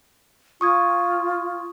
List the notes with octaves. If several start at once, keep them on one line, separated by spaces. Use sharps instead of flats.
F4 C#6 D#6 G#6